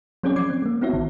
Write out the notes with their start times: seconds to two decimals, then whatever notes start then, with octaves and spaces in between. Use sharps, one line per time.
0.23 F#3 C4 C#4 G#4 C#5 D5
0.36 F3 D6 G#6 C7
0.50 C4
0.62 G#3 A#3
0.81 B3 C4 E4 F#4 C#5 E5
0.93 A1 D#3